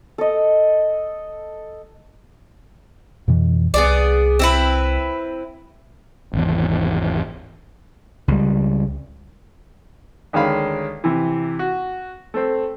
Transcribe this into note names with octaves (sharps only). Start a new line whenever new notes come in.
A4 D#5
F2 B2 E3
C2 B3 G#4 D5
C4 E4 B4
G#1 E2
C#2 G3
D2 D#3 G#3 C#4 F5 B5
C3 E3
F#4
A3 C4